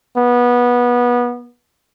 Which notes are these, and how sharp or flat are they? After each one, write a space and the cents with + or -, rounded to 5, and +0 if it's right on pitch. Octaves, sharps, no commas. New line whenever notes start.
B3 -20